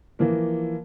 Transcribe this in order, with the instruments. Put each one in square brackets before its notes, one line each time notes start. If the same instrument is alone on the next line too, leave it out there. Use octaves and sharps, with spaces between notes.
[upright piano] E3 F3 A#3